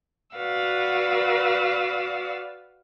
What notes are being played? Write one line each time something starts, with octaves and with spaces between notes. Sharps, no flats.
F#4 B4 D5 F5 F#5 E6